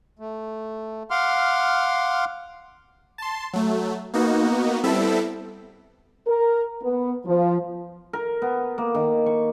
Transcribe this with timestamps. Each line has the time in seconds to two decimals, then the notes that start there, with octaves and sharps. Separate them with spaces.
0.19 A3
1.11 F5 F#5 C6 D6 F6
3.18 A5 C6
3.53 F#3 A3
4.14 A#3 B3 D#4 F#4
4.84 G3 B3 C4 E4 A4 E5
6.27 A#4
6.82 B3
7.26 F3
8.13 A#4
8.42 B3
8.78 A#3
8.95 D#3
9.26 C#6